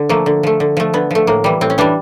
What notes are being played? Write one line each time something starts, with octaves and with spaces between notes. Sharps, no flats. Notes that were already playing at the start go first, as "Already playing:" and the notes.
Already playing: D3
F3 A3 A#3
D3
F3 A3
D3
F3 A3
D3 B3
F3 A3
A2 A#3
E3 G3
A2 C4
C#4
E3 G3 D4